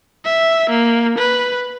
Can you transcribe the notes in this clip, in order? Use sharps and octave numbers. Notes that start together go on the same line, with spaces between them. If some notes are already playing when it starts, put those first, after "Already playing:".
E5
A#3
B4